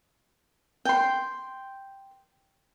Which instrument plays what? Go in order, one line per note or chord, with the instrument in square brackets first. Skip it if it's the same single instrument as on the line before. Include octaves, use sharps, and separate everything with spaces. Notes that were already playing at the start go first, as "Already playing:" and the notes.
[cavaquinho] G5 C6